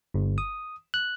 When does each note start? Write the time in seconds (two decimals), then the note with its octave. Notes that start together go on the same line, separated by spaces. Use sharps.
0.14 G1
0.38 D#6
0.94 F#6